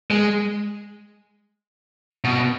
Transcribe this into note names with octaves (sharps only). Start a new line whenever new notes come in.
G#3
B2